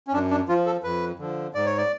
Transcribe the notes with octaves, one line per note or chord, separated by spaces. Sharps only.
C#4
F#2 D4
D4
F3 F4
A4
F2 B4
D3 F3
G#2 D5
C#5
D5